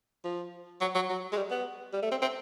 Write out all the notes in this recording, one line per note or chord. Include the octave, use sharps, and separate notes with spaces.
F3
F#3
F#3
F#3
G#3
G3
B3
G3
A3
C4
C4